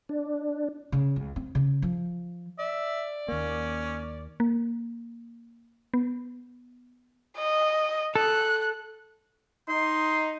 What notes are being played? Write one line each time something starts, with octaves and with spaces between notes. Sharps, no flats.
D4
C#3
C#2
C4
C#3
F3
D5 E5
D#2 A#3 C#4
A#3
B3
D#5
A4 F#6
D#4 C6